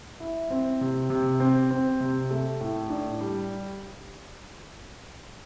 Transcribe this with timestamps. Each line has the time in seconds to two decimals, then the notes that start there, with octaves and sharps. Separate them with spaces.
0.20 E4
0.50 C4
0.81 C3
1.10 C3
1.40 C4
1.71 C4
2.00 C3
2.30 A3
2.61 A2
2.90 D4
3.21 G3